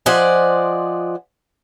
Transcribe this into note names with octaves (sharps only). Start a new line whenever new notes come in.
F3 C5 D5 D#5 F#5 G#5